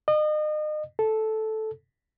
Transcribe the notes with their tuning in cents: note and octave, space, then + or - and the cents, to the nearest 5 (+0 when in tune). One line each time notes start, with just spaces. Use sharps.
D#5 -35
A4 -10